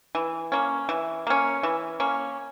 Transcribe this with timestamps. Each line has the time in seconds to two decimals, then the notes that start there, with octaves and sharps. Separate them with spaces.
0.15 E3
0.52 A#3 C#4
0.89 E3
1.27 A#3 C#4
1.63 E3
2.00 A#3 C#4